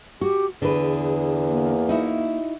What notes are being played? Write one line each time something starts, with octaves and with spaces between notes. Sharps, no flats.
F#4 G4
E2 D3 G#4 B4
A#3
D#4 E4 F#4